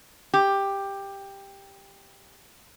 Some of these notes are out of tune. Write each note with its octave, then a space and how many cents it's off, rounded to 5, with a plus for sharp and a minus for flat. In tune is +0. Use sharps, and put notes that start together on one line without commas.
G4 +10